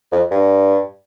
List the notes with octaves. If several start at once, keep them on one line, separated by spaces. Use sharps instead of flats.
F2
G2